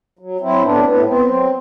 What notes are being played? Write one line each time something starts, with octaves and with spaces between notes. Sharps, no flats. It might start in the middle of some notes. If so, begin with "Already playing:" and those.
F#3
F#3 C4 E4
A2 B3 D4
C4
A2 B3
B3 C4
F#3